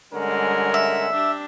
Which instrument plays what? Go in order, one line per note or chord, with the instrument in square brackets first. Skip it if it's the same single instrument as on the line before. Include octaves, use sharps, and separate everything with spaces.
[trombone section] D3 C#4 A#4 [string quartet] G3 G#3 F#5
[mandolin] E5
[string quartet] D4 G4